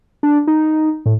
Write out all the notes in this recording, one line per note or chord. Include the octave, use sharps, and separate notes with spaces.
D4
D#4
A2